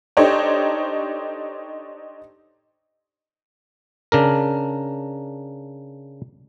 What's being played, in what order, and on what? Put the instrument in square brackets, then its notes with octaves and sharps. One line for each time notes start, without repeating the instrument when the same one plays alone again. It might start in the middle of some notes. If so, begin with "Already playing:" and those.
[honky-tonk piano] D4 D#4 G4 A4 C5 C#5
[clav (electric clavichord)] C#3 D4 A#4